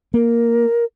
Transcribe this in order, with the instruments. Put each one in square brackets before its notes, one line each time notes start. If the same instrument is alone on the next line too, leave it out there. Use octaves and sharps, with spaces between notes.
[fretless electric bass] A#3 [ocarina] A#4